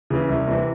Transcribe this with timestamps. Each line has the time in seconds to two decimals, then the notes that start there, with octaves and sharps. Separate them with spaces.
0.10 C#3 E3
0.29 C2
0.47 C3 E3